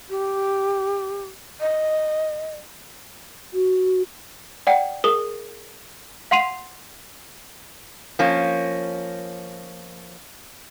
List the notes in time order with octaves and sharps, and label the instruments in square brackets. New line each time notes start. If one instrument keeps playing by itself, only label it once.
[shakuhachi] G4
D#5
[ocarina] F#4
[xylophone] D5 F#5 G5
G#4 A#4 D#6 G7
F5 F#5 C6 C7 D#7 F7
[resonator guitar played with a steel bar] F3 A#3 C#4